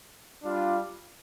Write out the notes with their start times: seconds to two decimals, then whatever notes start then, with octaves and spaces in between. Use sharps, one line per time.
0.43 G3 D4 F4